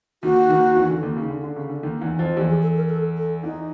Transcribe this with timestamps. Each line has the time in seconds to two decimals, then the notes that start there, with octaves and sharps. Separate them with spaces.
0.23 D#2 D#3 F#4
0.50 D#2 D#3
0.76 E2 E3
0.90 D3
1.03 D#2 D#3
1.17 C#3
1.30 D3
1.44 D3
1.56 C#3
1.70 D3
1.83 D#2 D#3
2.01 E2 E3
2.19 F2 F3
2.36 E2 E3 G4
2.50 G#4
2.63 A4
2.77 A#4
2.89 A4
3.17 A4
3.43 E2 E3 D#4